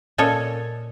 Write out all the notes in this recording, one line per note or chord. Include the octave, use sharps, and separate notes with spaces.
A#2 C#4 A4 C#5 D#5